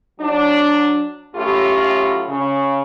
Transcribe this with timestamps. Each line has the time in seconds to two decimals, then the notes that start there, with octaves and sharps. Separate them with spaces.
0.19 F#3 D4
1.34 F#2 A2 A3 F4 G4
2.27 C#3